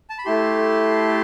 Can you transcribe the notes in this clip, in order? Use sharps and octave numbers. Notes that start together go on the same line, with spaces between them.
A5
B5
A3 E4 G4 A5 C6